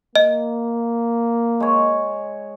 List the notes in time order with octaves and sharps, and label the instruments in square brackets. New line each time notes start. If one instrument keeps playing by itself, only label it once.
[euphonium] A#3 [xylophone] D#5
[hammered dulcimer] G#3 C#5